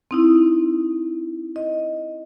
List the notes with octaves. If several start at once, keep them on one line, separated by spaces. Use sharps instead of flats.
C4 D#4 E4
D#5